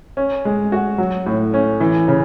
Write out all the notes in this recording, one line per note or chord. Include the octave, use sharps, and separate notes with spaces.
C#4
G#3
F#4
F#3
A2
C#4
E3
C#3